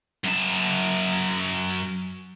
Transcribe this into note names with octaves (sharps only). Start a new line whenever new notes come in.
F#2 A5